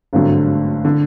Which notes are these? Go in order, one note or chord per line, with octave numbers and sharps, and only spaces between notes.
G#1 G2 D3 F#3 A3
D3